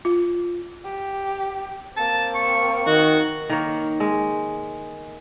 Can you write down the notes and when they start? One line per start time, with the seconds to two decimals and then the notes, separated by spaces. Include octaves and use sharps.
0.05 F4
0.85 G4
1.96 A#3 C4 A5
2.35 C#6
2.87 D#3 F#4
3.49 D#3 A#3 C#5
4.00 G#3